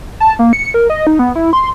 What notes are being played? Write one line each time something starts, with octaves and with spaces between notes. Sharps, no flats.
A5
A#3
C#7
A#4
D#5
D#4
B3
E4
C6